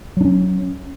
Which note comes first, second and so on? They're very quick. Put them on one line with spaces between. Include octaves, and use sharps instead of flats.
F#3 D4 C#4